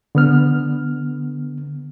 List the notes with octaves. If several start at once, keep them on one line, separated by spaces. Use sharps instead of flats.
D3 B3 F6